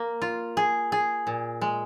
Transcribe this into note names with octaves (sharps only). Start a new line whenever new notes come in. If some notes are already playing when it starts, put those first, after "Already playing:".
Already playing: A#3
F4
G#4
G#4
A#2
G#3